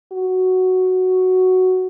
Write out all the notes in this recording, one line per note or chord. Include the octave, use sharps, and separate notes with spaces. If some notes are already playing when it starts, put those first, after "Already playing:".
F#4